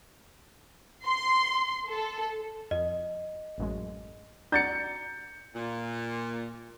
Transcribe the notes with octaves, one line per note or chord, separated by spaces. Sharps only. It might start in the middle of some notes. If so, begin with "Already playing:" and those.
C6
A4
F2 D#5
A1 F#2 G#3
D4 F#4 D5 A#5 G6 A6 C#7
A#2